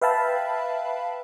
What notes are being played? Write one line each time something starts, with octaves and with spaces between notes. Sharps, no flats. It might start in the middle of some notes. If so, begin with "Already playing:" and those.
B4 E5 F5 G5 A5 B5